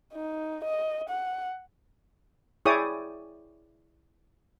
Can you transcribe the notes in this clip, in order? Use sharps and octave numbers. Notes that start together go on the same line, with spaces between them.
D#4
D#5
F#5
E4 G#4 C#5 D5 G5 D#6